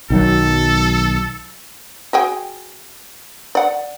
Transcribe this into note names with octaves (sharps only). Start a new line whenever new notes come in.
B1 D#3 F#3 A4
F#4 G#4 G5
D5 F#5